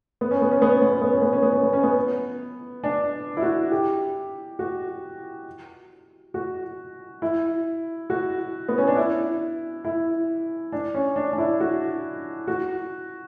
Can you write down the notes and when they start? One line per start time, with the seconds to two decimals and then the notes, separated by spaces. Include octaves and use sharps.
0.21 B3
0.31 C#4
0.42 B3
0.51 C#4
0.62 B3
0.72 C#4
0.82 B3
0.92 C#4
1.02 B3
1.13 C#4
1.22 B3
1.33 C#4
1.43 B3
1.53 C#4
1.63 B3
1.73 C#4
1.83 B3
2.84 D4
3.37 E4
3.42 F#4
3.71 G4
4.59 F#4
6.34 F#4
7.22 E4
8.10 F#4
8.68 B3
8.78 C#4
8.87 D4
8.97 E4
9.85 E4
10.72 D4
10.94 C#4
11.16 D4
11.33 D4
11.38 E4
11.60 F#4
12.48 F#4